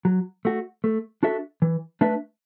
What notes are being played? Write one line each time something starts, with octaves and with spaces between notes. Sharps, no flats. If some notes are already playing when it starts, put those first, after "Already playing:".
F#3
A3 F#4
A3
D4 F#4 A4 E5
E3
A3 D4 B4 E5